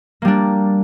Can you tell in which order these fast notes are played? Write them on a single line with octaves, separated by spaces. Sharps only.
A#3 G3 D4